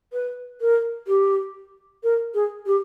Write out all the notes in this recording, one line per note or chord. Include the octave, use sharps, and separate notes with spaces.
B4
A#4
G4
A#4
G#4
G4